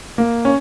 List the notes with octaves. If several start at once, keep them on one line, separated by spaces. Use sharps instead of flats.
A#3
C#4